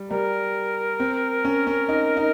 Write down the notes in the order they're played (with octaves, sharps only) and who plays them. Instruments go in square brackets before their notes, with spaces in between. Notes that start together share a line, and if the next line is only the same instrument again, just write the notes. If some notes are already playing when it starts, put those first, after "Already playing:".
Already playing: [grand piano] G3
[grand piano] G3 [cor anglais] A#4
[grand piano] C4
C#4
C#4
D#4
D#4